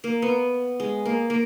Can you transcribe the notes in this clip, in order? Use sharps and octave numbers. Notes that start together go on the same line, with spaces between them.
A#3
B3
G#3
A#3
A#3